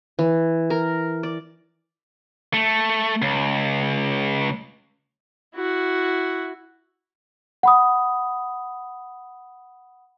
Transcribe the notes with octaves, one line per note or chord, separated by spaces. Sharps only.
E3
A#4
D5
A3
C#2
E4 F#4
F#5 B5 D#6